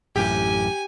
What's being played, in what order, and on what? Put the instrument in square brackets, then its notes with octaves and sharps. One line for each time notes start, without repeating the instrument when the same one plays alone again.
[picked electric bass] A1 F#2 A2 [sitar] G4 [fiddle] G#5